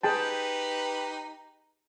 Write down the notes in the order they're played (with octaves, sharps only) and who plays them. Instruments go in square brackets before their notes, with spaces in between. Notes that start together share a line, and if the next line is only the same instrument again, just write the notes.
[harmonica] D#4 G4 B4 [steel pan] G#4 G5 A5